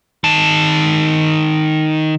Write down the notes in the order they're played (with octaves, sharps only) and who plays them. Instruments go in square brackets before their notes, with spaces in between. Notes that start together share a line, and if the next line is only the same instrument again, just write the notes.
[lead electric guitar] D#3 A5